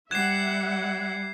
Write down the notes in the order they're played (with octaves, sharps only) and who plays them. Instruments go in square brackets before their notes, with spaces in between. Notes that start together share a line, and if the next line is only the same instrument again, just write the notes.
[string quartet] G3 [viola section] E5 F#5 [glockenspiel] F#6 E7 [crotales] G#6 C7